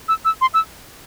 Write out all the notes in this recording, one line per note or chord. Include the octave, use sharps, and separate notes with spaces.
E6
E6
C6
E6